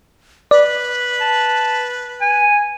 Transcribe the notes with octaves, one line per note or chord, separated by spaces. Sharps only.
B4 D5
A5
G#5